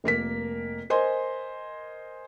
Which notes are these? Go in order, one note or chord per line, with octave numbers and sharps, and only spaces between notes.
F1 A#3 A#4 B6
A#4 C5 D#5 G#5 C6